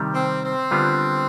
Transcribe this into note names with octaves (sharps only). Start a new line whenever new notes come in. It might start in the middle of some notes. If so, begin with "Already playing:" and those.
Already playing: C3 D#3 G3
C4
C4
D3 G3 B3 D4 F4